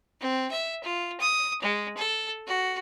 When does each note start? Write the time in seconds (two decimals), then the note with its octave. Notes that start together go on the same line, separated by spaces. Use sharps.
0.20 C4
0.51 E5
0.83 F4
1.20 D#6
1.62 G#3
1.97 A4
2.47 F#4